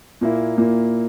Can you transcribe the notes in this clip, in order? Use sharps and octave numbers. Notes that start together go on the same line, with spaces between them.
A#2 A#3 E4
A#2 A#3 E4